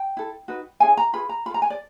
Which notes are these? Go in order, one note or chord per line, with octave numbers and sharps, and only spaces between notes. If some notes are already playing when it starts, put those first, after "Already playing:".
Already playing: G5
E4 A4
D#4 F#4 B4
C#4 E4 G#4 G#5
A#5
F4 G#4 B4 B5
A#5
F4 A4 B5
A#5
G#5
D5